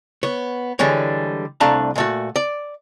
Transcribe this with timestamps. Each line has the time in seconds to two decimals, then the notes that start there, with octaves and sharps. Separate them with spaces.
0.23 B3 C#5
0.79 D3 E3 G3 G#3 C#5
1.60 C2 A3 D4 F5 A5 A#5
1.95 A#2 A3 F#4
2.36 D5